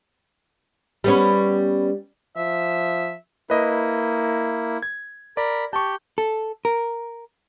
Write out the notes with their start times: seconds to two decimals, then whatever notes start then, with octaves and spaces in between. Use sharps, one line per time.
1.04 G3 B3 C#4
2.37 F3 E5
3.50 A#3 E4 B4 D#5
4.82 G#6
5.37 A#4 D5 B5
5.73 G4 A5 C#6 G6
6.18 A4
6.65 A#4